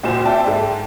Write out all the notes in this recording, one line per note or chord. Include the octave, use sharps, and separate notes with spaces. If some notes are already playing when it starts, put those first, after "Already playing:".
C#2 A#2 F#4 C5 G#5 E7
C4 D5 E5 G5 A5
G#2 A4